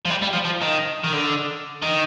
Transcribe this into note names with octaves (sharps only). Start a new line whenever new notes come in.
F3
G3
G3
F3
F3
D#3
D#3
D3
D#3